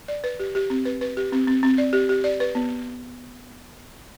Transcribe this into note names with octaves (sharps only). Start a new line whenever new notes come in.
D5
B4
G4
G4
C4
B4
B4
G4
C4
C4
C4
D5
G4
G4
D5
B4
B3